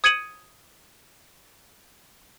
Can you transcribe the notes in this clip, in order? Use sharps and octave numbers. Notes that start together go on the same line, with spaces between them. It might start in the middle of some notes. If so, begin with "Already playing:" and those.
D#6 G#6 C#7 D#7 F#7